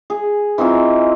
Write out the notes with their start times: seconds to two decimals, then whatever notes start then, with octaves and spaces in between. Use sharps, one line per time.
0.10 G#4
0.58 E3 C4 D#4 F4